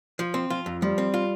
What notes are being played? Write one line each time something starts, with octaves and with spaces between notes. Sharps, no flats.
F3
C4
F3 F4
F2
F3 G3
C4
F4